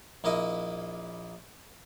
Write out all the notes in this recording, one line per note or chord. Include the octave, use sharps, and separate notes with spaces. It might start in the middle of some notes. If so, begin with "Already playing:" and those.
A#1 A#3 E4 D#5